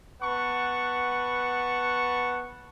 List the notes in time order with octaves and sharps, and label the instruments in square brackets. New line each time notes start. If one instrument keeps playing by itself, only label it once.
[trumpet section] B3 B4 F#5 A5 C#6